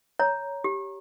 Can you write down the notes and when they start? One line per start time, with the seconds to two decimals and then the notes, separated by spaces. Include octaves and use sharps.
0.19 C#5 A#5
0.64 G4